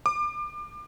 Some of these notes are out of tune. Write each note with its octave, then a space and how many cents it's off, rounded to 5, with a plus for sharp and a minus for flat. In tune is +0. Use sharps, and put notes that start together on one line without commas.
D6 +30